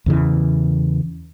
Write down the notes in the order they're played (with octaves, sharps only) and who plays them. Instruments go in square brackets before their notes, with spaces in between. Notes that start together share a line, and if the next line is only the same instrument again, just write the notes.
[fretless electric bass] E2 C#3 E3